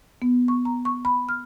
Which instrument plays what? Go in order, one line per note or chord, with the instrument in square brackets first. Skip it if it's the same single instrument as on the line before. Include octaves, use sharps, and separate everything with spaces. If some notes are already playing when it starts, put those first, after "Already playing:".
[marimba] B3
C#6
A#5
C#6
B5
F6